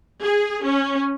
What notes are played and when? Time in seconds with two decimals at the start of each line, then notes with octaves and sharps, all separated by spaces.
0.23 G#4
0.65 C#4